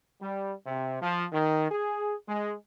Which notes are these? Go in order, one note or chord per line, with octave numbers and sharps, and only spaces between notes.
G3
C3
F3
D#3
G#4
G#3